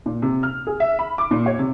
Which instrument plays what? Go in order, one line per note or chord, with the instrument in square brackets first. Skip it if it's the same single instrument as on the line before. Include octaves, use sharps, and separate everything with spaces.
[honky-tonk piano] A#2
C3
F6
G#4
E5
B5
D6
A#2
C#5
C3